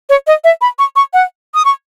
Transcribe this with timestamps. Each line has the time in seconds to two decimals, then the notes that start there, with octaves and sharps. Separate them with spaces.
0.09 C#5
0.27 D#5
0.44 E5
0.61 B5
0.79 C#6
0.96 C#6
1.13 F#5
1.54 D#6
1.65 C#6